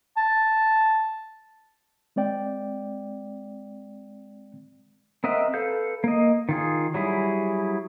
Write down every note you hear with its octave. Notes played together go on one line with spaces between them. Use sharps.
A5
G#3 C4 D5 G5
C4 A#4 D#5 E5 F#5
A4 B4 F5 G6
A#3 D#5
D#3 F4 G#4
F#3 G3 E4 G#4